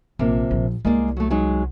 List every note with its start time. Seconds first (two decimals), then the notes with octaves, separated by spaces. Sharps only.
0.19 A#1 C3 F3 A#3
0.51 A#1
0.85 C2 G#3 A#3 D5
1.17 F#3 A3
1.30 F#3 G#3 D#4